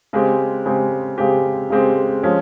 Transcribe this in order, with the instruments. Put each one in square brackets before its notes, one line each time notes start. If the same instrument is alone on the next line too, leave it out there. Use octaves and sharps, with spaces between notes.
[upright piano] C#3 G#3 C4 G4
C#3 G#3 C4 G4
C#3 G#3 C4 G4
C#3 G#3 C4 G4
F3 G#3 C#4